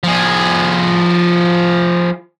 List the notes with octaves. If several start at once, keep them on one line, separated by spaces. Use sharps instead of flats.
F3 G#4